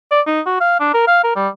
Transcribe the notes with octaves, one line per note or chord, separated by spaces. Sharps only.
D5
D#4
F#4
F5
D4
A#4
F5
A#4
G3